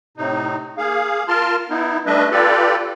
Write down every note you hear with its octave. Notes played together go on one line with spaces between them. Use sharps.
A2 C3 D#4
A#3 G#4 F5
F4 A#4 A5 C6 F6
B3 D#4 E4
G3 A3 D4 B4 D#5 E5
F4 G4 A4 B4 D5